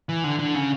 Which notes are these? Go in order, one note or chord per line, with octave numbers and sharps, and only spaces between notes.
E3
D3
D3
C#3